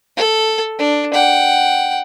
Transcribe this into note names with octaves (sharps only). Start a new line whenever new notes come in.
A4
D4
F#5 G5